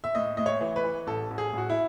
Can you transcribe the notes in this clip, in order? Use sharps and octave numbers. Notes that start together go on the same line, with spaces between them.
E5
A2 D#5
A2 D#5
C#5
E3
B4
E3
A1 A4
A1
G#4
A1 F#4
E4